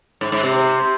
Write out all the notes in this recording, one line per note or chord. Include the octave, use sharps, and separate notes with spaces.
G#2
G#2
C3